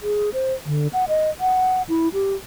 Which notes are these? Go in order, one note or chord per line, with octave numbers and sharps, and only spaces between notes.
G#4
C5
D3
F#5
D#5
F#5
E4
G4